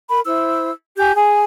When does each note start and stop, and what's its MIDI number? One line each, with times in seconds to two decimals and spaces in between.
0.09 0.20 70
0.09 0.20 83
0.25 0.71 64
0.25 0.71 72
0.25 0.71 88
0.97 1.12 67
0.97 1.12 80
0.97 1.12 91
1.16 1.44 68
1.16 1.44 80